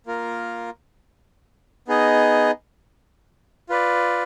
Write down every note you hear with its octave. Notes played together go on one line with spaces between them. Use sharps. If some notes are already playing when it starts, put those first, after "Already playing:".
A#3 F4 A#4
B3 D#4 G#4 D#5
F4 B4 D5